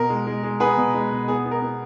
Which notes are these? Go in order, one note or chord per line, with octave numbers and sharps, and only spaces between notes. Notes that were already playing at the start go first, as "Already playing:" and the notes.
Already playing: B2 A#4
G#3
G#3
G#3
B3 G#4 B4
B2
G#3
B2
B3 G#4
B3
A#4
B3